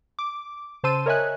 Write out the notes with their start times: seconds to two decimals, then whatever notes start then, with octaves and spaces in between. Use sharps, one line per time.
0.19 D6
0.84 C#3 C5 A5 C6 E6 D#7
1.06 A#4 C#5 D#5 E5 G#5 F#6